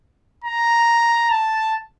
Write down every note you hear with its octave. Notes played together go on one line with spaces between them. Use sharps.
A#5
A5